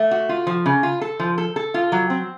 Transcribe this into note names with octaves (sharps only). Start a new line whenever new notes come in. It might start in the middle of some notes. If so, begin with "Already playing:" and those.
Already playing: A3
F#4
F4
F3
C#3
F4
A4
F3
A4
A4
F4
F#3
C4